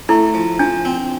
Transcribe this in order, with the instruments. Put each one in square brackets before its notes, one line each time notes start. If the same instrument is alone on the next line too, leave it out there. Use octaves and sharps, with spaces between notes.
[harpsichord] A3 [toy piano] E4
[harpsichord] F3
[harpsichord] F3 [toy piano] D4
[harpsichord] C4